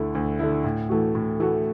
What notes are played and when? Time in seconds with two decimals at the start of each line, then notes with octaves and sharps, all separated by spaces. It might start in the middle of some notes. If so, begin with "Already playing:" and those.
Already playing: D2 D3 A3 E4
0.15 D2
0.39 D3 A3 E4
0.64 A2
0.89 E3 A3 F#4
1.15 A2
1.40 E3 A3 F#4